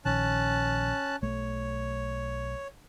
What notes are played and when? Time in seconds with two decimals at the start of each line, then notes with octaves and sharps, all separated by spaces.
0.05 A#1 D#3 C#4 A5 F#6
1.22 B1 A3 C#5